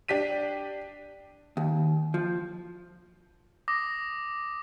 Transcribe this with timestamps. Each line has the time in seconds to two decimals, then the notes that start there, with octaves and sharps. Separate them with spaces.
0.08 D4 G4 B6 D#7
1.57 D#2
2.14 F3
3.68 D6 D#6 A#6